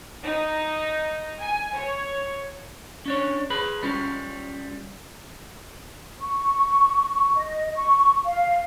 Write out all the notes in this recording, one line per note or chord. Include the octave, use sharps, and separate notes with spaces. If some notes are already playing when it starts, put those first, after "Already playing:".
D#4
G#5
C#5
C#4 D4 C#5
G#4 B4 B5
G3 C#4 F4
C#6
D#5
C#6
F5